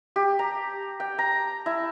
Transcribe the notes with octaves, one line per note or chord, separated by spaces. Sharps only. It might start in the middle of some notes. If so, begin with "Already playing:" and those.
G4
A#5
G5
A#5
E4